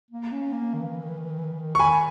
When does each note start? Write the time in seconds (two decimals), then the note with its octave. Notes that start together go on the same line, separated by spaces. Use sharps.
0.11 A#3
0.32 C#4
0.53 A#3
0.74 D#3
0.81 E3
0.89 D#3
0.95 E3
1.03 D#3
1.09 E3
1.17 D#3
1.24 E3
1.31 D#3
1.38 E3
1.44 D#3
1.51 E3
1.59 D#3
1.75 C#6
1.79 D#3 G#5 B5